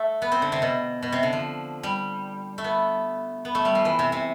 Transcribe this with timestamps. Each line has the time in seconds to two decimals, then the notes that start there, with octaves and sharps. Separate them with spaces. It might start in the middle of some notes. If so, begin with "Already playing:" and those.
Already playing: A3
0.22 B3
0.32 C4
0.42 D3
0.52 C3
0.62 B2
1.02 B2
1.12 C3
1.23 D3
1.33 F3
1.83 G3
2.58 A3
2.64 B3
3.45 B3
3.55 A3
3.65 G3
3.75 F3
3.85 E3
3.99 C3
4.12 C3